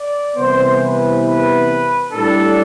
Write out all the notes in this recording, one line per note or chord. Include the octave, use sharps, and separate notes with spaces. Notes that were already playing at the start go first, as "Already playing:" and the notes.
Already playing: D5
C2 C3 E3 B3 C5
B4
B4
A2 G3 D4 A4